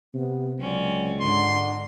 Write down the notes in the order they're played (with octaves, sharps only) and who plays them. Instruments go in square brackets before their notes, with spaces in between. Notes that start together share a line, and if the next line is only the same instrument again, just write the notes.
[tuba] C3 [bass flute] B3
[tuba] C#2 [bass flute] F#3 [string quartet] C4 C#4 D5
[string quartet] G#2 [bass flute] D3 [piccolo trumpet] C6